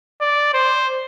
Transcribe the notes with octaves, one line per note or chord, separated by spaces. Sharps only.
D5
C5